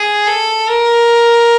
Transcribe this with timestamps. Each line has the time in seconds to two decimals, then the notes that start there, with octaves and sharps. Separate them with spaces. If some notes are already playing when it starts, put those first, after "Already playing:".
Already playing: G#4
0.27 A4
0.68 A#4